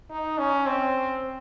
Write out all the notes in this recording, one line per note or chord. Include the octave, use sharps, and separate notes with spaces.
D#4
C#4
C4